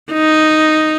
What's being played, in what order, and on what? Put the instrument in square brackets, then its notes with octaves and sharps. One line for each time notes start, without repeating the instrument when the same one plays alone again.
[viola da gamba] D#4